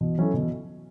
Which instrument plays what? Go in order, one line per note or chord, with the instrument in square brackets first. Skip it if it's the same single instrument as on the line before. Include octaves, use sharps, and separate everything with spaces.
[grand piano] B2 [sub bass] E3
[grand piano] F#3 C#4 E4 A4
[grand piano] B2 [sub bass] D3
[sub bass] E3